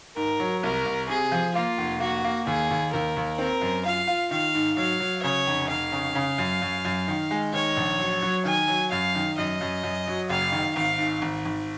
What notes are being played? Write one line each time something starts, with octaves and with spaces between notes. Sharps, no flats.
G#2 A#4
F#3
C2 A#4
C2
C3 G#4
F3
A#3 F4
F1
A#3 F#4
A#3
D#2 G#4
D#2
D#2 A#4
D#2
C4 A#4
F#2
F4 F5
F4
D#3 F5
G#2
F#3 F5
F#3
C#3 C#5
F1
F1 F5
C#3
C#3
F#2
F#2
F#2
D#3
G#3
D#3 C#5
A#1
F#3
F#3
D#3 G#5
F#3
F#2 F5
D#3
F#2 D#5
F#2
F#2
F#3
F#1 F5
D#3
G#1 F5
G#2
G#1
G#1